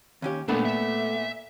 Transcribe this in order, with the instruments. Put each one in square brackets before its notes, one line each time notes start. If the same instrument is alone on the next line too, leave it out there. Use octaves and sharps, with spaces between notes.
[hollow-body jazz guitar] D#2 C#4 G4
[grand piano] A#2 B3 A4 [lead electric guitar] G#3 D4 [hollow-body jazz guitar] A3
[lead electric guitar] E5